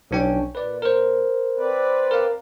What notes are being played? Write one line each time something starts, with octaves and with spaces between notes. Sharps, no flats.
B1 C#4 D4 G5
A#2 B4 D5
A#4 C5
C4 B4 D5
A#4 F5